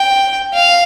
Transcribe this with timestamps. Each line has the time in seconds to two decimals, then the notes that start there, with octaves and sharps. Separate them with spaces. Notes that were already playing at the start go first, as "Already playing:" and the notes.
Already playing: G5
0.53 F5